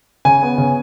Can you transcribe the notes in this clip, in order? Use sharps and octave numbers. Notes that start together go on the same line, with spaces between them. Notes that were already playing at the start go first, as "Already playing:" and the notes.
C#3 G#5
B3
C#3